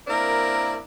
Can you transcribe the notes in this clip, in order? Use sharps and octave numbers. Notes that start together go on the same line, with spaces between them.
A#3 C4 D4 E4 A#4